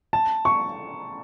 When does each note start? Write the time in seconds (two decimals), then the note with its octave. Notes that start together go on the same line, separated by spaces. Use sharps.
0.13 A5
0.45 C#6